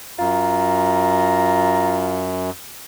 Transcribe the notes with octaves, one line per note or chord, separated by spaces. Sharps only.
F#2 F4 A#5